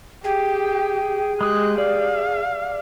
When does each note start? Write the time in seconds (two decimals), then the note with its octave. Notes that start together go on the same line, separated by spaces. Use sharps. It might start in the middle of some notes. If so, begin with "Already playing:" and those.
0.24 G4 G#4 G5
1.41 G#3 G4 D#6 F#6
1.78 D5 F5